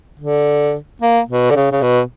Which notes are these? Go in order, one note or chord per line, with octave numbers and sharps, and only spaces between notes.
D3
A#3
B2
D3
C#3
C#3
B2